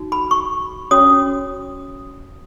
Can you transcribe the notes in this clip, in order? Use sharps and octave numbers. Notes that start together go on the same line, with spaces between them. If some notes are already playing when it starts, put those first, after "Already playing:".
Already playing: D#4 F#4
B5
C#6
C#4 F#4 C#5 D#6